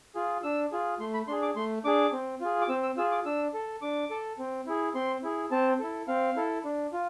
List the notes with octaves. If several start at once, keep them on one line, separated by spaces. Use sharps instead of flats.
F4 G#4
D4 E6
F4 G#4
A3 C6
B5
D4 G#4 C6
D6
A3 C6
D4 G#4 D6
C4
F4 G#4
D6
C4 E6
E6
F4 G#4 E6
D6
D4 E6
A4
D4 D6
A4
C4
E4 G#4
C4 C6
E4 G#4
C4 A5
E4 A4
C4 F5
E4 A4
D4
F4